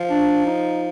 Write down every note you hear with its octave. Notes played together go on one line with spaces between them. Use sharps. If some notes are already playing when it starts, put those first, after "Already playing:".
Already playing: F3
D4
D#4